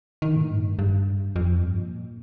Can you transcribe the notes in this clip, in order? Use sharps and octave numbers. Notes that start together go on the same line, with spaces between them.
D#3
A2
G2
G2
F2
G2
A#2